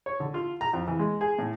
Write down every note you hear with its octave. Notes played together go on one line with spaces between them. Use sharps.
C#5
D3
F4
A#5
F2
E3
G#3
G#4
A2